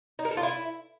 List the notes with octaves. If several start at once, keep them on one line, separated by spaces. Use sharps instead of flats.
D#4
A#4
A4
F4
E4